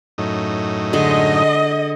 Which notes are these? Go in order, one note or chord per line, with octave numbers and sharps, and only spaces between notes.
F#2 A2 D#4
D3 G#3 D#5